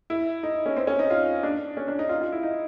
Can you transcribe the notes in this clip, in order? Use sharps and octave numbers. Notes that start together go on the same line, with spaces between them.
E4
D#4
C#4
C4
C#4
D#4
F4
D4
C#4
D4
D#4
F4
F4
E4
D#4